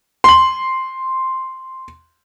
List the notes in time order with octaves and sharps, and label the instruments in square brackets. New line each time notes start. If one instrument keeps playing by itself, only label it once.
[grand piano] C6 F#7